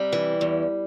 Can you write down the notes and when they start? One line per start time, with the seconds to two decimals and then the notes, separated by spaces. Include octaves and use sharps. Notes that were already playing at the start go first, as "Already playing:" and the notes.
Already playing: C3 G3
0.12 E3
0.41 E2